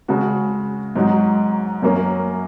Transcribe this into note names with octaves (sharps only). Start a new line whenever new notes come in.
C#3 G#3 F#4
G#2 F#3 D#4 F#4
F#2 F#3 A#3 C#4